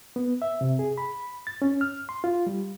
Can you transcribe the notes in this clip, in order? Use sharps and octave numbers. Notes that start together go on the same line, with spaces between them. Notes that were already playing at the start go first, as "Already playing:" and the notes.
B3
E5
C3
G#4
B5
A6
C#4
F6
C6
F4
G3